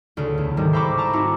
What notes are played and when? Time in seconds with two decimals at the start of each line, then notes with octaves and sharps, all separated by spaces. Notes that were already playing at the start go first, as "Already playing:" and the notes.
0.17 D2 C#3
0.38 E2
0.57 C2 G#2 D#3 G3
0.73 C5 E5 A#5 B5 C#6 D6
0.98 A5 A#5 D6
1.13 C4 D#4 E4 F#4